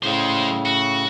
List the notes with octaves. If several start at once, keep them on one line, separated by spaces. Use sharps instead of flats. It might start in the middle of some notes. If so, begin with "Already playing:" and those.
A2 C#3 G#3 C5
F#4